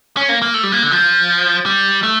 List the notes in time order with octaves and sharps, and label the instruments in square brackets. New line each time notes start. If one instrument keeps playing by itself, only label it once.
[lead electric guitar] C#4
A#3
A#3
A3
G3
A#3
D3
F3
G3
A3